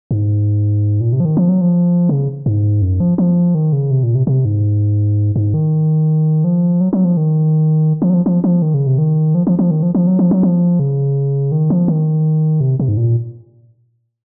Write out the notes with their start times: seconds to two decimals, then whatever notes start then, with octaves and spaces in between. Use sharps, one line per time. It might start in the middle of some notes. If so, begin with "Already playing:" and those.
0.11 G#2
1.01 A#2
1.13 C3
1.20 F3
1.25 D#3
1.37 F3
1.49 F#3
1.61 F3
2.09 C#3
2.46 G#2
2.82 F#2
3.00 F3
3.18 F3
3.55 D#3
3.73 C#3
3.91 C3
4.03 A#2
4.15 C3
4.27 C3
4.45 G#2
5.36 G#2
5.54 D#3
6.44 F3
6.81 F#3
6.93 F#3
7.05 F3
7.17 D#3
8.02 F3
8.10 F#3
8.14 F3
8.26 F3
8.44 F3
8.62 D#3
8.74 C#3
8.87 C3
8.98 D#3
9.35 F3
9.47 F3
9.59 F3
9.71 D#3
9.83 F3
9.95 F3
10.07 F#3
10.19 F3
10.31 F#3
10.43 F3
10.80 C#3
11.52 D#3
11.70 F3
11.88 D#3
12.61 C3
12.80 C3
12.88 G#2
12.97 A#2